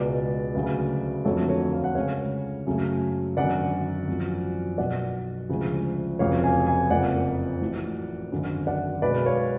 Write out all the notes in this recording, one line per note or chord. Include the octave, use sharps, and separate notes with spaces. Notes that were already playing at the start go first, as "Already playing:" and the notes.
Already playing: C#2 B2 G#3 B4 D5
D2 C#3 F#3 A3
F2 D3 F#3 A3 A4 C#5
A4 C#5
F5
F#5
D2 C#3 G#3 C#5 F5
F#2 C#3 F#3 A3
G#1 F#2 D3 F#3 D5 F#5
G#1 F#2 F3
B1 B2 F#3 D5 F#5
D2 C#3 F3 G#3
F1 F2 C#3 F#3 C#5 F5
F5 G#5
F5 G#5
F#1 F2 F3 D5 F#5
A1 A2 F#3
G#1 F#2 D3
D5 F#5
B1 B2 G#3 B4 D5
C#5 F5